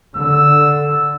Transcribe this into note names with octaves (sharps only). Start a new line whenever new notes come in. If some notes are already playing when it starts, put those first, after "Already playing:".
D3 E6